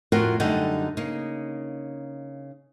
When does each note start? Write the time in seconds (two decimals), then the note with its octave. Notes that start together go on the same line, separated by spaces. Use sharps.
0.12 F2 A2 F4 F#4 A#4 F#5
0.40 F#2 D3 G3 D#4 A4 F#5
0.97 C#3 A#3 D#4